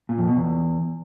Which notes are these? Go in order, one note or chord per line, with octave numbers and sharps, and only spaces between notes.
A#2
F2
B2
E2